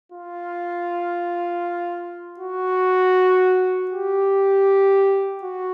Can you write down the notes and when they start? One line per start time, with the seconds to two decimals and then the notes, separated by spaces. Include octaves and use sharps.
0.12 F4
2.39 F#4
3.91 G4
5.43 F#4